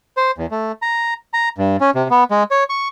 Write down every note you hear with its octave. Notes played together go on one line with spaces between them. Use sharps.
C5
E2
A3
A#5
A#5
G2
C#4
C3
B3
G#3
C#5
C#6